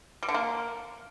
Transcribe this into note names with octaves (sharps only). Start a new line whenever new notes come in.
G3
D3
A#3